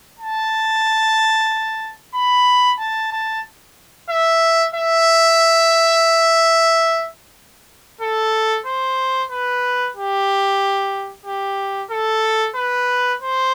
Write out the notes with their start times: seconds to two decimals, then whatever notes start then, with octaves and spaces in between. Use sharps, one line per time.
0.19 A5
2.15 B5
2.80 A5
3.13 A5
4.10 E5
4.75 E5
8.01 A4
8.66 C5
9.31 B4
9.96 G4
11.26 G4
11.91 A4
12.56 B4
13.22 C5